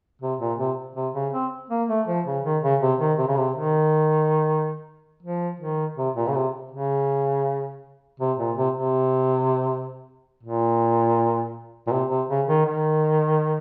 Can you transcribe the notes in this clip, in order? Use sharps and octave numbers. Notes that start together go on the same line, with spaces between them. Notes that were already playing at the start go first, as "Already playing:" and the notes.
C3
A#2
C3
C3
C#3
C4
A#3
A3
F3
C#3
D#3
C#3
C3
D#3
C3
C#3
C3
D#3
F3
D#3
C3
A#2
C#3
C3
C#3
C3
A#2
C3
C3
A#2
A#2
C3
C3
C#3
D#3
D#3